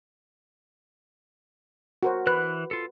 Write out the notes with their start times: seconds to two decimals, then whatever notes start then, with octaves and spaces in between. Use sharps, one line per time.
2.03 F#4 A#4 C5
2.27 E3 B4 F#6
2.71 F4 A4